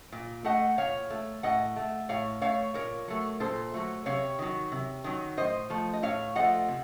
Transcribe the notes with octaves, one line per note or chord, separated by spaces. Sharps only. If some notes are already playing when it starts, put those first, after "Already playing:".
A#2
A3 D#5 F#5
A#2 C#5 F5
A3
A2 D#5 F#5
A3
A2 C#5 F5
A3 C#5 F5
A#2 A#4 C#5
F#3 A3
A#2 A4 C5
F#3 A3
C3 C#5 F5
D#3 F#3
C3
D#3 F#3
A2 C5 D#5
F3 A3
D#5
A2 C#5 F5
F3 A3 D#5 F#5
C3